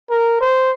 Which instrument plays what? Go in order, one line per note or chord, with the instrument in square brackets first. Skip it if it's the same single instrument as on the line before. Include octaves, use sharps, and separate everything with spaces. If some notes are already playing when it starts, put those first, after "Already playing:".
[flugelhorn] A#4
C5